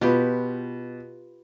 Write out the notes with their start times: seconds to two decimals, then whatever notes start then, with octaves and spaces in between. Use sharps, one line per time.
0.01 B2 F4 G4 B4